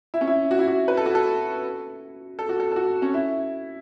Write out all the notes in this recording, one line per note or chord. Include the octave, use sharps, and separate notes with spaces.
E4
C#4
E4
F#4
E4
F#4
B4
A4
F#4
A4
A4
F#4
A4
A4
F#4
C#4
E4